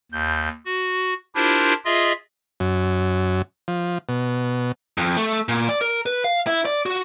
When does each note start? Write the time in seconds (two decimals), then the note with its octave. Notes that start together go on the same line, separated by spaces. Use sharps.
0.12 D#2 G6
0.65 F#4
1.35 D4 E4 F4 G4 A#4 C5
1.85 F4 G#4 D#5 E5
2.60 F#2
3.68 F3
4.09 B2
4.98 F2
5.17 A3
5.49 A#2
5.69 D5
5.81 A#4
6.06 B4
6.24 F5
6.47 E4
6.66 D5
6.86 F#4